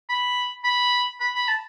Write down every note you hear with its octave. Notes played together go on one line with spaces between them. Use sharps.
B5
B5
B5
B5
A5